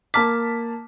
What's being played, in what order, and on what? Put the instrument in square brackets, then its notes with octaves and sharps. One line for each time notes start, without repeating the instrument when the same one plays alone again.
[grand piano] A#3 A5 B6 [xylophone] D6 F6